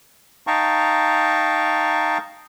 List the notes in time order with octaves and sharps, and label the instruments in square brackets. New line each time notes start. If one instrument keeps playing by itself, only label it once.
[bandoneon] D#4 F5 G5 A5 A#5 C#6